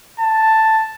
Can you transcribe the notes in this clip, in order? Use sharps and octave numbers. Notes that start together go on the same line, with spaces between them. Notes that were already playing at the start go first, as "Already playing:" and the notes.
A5